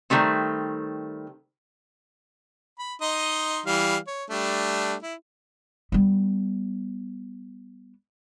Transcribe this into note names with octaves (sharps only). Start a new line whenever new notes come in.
D#3 G3 A3 C4
B5
D#4 D#5 C6
E3 G3 F5
C#5
G3 A3 D4
E4
G3 B3